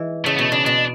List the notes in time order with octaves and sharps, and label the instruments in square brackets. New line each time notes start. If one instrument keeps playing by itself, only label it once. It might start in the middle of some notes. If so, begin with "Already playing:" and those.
Already playing: [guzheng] E3 G#3
[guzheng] C#3 [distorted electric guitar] A3
[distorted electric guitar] B3
[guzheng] B2 [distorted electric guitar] A3
[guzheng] C#3 [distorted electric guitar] D4
[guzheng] B2 [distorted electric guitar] D4